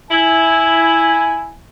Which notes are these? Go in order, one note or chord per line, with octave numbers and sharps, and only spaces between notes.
E4 G#5